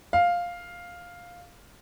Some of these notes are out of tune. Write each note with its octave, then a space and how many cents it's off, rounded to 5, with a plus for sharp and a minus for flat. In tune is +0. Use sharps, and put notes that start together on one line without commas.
F5 +5